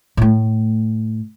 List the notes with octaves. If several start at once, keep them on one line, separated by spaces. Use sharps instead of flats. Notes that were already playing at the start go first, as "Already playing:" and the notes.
A2 A3